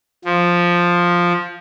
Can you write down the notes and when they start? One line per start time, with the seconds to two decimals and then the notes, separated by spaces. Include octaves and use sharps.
0.25 F3